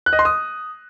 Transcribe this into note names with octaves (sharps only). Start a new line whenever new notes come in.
F#6
D#5
C6
D#6